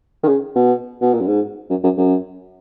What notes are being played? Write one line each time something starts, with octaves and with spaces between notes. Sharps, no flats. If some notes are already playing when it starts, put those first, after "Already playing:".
D#3
C#3
B2
B2
A#2
F#2
G#2
F#2
F#2
F#2